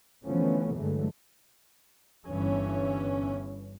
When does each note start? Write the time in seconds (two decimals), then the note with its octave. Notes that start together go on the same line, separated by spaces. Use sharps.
0.24 D3 E3 F3 A3 B3 C#4
0.75 G2 D3 E3 F#3 G#3 A3
2.27 G1 G2 E3 C#4